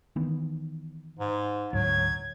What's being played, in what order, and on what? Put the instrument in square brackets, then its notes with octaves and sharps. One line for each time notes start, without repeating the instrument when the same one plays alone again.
[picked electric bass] D#3 E3 B3
[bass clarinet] G#2
[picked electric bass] D2 G#2 [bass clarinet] F#3 [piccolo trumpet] G#6